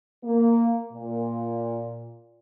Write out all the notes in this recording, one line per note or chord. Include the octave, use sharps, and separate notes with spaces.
A#3
A#2